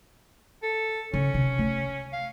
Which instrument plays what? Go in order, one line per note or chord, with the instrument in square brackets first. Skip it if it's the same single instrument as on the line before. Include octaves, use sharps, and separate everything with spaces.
[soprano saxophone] A4
[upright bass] C#3 [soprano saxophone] C#4
[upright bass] C3
A3
[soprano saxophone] F5